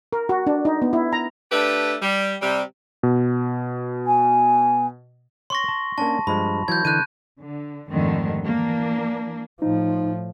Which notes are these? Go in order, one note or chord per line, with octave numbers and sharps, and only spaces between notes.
A#4
F#4
D4
D#4
B3
E4
A#5
A3 D4 G4 B4
G3
C3 G3
B2
G#5
C#5 C6 C#6 A#6
A5
A#3 C#4 D4 A5
G2 F3 G#3 B5
E3 F#3 G6 G#6
D3 E3 A5 F#6 G6 D#7
D3
F2 G#2 D3 D#3 G3 A3
E3 A#3 D4
A2 F3 D#4